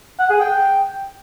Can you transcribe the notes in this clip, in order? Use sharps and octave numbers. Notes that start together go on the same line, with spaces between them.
F#5
G#4
G5